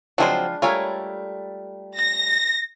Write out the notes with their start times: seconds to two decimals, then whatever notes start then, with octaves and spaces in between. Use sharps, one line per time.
0.18 C#3 F3 F#3 G#3 C4 D4 C5 G5
0.62 G3 A3 F4 A#4 C#5 G#5
1.98 A#6